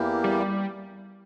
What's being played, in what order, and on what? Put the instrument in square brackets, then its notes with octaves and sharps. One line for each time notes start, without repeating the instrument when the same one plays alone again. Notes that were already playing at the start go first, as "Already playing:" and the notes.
Already playing: [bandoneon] E2 E3 A#3 E4 G4
[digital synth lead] G3